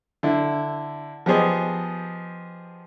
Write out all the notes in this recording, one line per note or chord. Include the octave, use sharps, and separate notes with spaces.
D3 E4
F3 B3 G4 G#4 C5 D#5